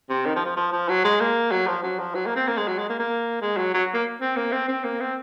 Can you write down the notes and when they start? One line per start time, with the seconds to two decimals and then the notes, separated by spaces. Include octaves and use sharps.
0.10 C3
0.26 D#3
0.36 F3
0.46 F3
0.57 F3
0.73 F3
0.89 F#3
1.05 G#3
1.20 A#3
1.52 F#3
1.68 F3
1.83 F#3
1.99 F3
2.15 F#3
2.26 A#3
2.36 C4
2.47 A#3
2.57 G#3
2.68 F#3
2.79 G#3
2.90 A#3
3.00 A#3
3.42 G#3
3.58 F#3
3.74 F#3
3.94 A#3
4.21 C4
4.36 A#3
4.52 C4
4.68 C4
4.84 A#3
5.01 C4